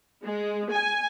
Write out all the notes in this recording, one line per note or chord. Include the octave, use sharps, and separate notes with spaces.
G#3
G#5